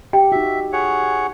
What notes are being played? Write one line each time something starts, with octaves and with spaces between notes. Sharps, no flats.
G4 G5
D#4 F#4 E5
G#4 C#5 F#5